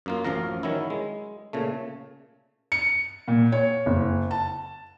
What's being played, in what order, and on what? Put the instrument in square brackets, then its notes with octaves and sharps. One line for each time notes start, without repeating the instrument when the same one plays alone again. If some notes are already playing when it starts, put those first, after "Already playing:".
[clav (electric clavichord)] F#2 A#3 F4
A1 F#2 F3 F5 A#5
D#3 F#3 C#4 E4
G#3
A#2 C#3 A3
[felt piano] C#7
A#2
C#5
F#1
A5